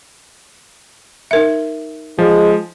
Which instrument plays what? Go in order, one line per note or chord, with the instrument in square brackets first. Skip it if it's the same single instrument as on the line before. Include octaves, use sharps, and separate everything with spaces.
[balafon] D#4 A#4 E5
[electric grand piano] F3 [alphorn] G#3